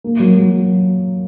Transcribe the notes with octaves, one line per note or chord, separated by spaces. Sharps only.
A#3
F#3
F#3